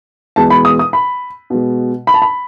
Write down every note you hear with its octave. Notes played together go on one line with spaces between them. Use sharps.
E2 B2 G#3 A5
B5
D#6
D#6
B5
B2 G#3
B5
A5
B5